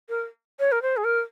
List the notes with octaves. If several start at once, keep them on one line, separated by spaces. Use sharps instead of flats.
A#4
C#5
A#4
C5
G#4
A#4